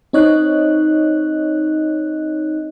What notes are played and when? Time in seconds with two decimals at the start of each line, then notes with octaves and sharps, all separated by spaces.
0.13 C4 D#4 C#5 D#5 F#6